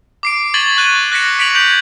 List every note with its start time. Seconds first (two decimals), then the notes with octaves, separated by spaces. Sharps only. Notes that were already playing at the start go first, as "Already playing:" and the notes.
0.23 D6 C7 D7
0.54 C#6 G#6 A6 B6 F#7 G7
0.77 C#6 F#6 D#7 F#7
1.12 F#6 A#6 B6 C#7 E7
1.39 D6 B6 C#7 D7 F7 F#7
1.55 G6 G#6 D7 F#7